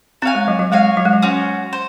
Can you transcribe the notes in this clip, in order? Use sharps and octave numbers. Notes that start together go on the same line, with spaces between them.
C4 F#4 C#5 F5 G#5
G#3
F#3
F#3
G#3 F#4 C#5 F5 G#5
F#3
G#3
F#3
C#4 F#4 C5
C5